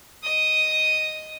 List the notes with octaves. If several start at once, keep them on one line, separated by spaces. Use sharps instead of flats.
D#5 D#6